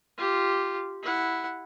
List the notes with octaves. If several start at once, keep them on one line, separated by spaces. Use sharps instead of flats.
F4 G4
E4 F#5